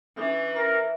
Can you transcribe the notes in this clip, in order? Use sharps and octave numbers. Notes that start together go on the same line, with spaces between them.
E3 C#4 D4 E5
A#4 E5